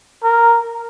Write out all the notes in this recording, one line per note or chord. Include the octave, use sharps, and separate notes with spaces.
A#4